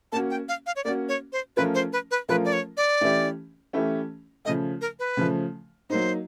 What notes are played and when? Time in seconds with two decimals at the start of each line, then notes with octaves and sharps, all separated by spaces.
0.12 A#3 C#4 F#4 A5
0.30 G5
0.49 F5
0.66 F5
0.76 C#5
0.84 A#3 C#4 F#4 D5
1.09 C#5
1.33 C5
1.57 F3 A3 C#4 F4 A#4 B4
1.75 C5
1.93 B4
2.11 B4
2.29 F3 A3 C#4 F4 A#4 B4
2.45 D5
2.53 C#5
2.77 D5
3.01 E3 A3 C#4 E4 G4
3.73 E3 A3 C#4 E4 G4
4.45 C#3 F3 A3 D#5
4.81 A#4
4.99 B4
5.17 C#3 F3 A3
5.90 F#3 A#3 D#4 C5